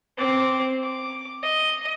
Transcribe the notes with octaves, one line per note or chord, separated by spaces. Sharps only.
C4 D6
D6
D#5